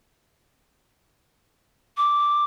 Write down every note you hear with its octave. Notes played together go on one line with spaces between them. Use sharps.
D6